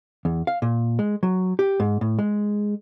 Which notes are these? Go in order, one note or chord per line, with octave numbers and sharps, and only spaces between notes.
E2
F5
A#2
G#3
F#3
G4
G#2
A2
G#3